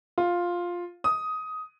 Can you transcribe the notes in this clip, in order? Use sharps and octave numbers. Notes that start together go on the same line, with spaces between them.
F4
D#6